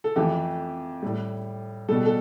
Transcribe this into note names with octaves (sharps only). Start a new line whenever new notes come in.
A4
F2 E3 A3 G4
A2 G3
B2 G3 A4
A4